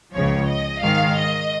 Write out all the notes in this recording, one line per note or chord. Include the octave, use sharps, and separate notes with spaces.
C#2 C#3 F3 C#5
D#5
G#2 D#3 F5
D#5